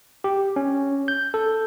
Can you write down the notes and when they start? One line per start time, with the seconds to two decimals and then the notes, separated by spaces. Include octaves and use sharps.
0.24 G4
0.56 C#4
1.08 G6
1.34 A4